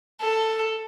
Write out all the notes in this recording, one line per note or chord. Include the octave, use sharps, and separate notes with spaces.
A4